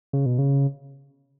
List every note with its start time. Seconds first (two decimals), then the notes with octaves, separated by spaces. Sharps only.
0.13 C#3
0.26 B2
0.39 C#3